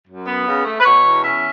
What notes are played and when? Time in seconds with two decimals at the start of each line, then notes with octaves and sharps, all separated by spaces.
0.07 F#2
0.27 B3
0.46 C#3
0.65 A3
0.80 B4
0.85 B2 C#5
1.03 E2
1.23 C#4 E5